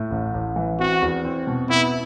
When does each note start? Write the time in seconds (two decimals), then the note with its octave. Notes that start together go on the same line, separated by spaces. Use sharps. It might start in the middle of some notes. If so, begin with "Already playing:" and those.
Already playing: A2
0.11 A1
0.34 A1
0.56 E3
0.79 C4 F#4
1.02 E2
1.25 C4
1.47 B2
1.70 B3 E4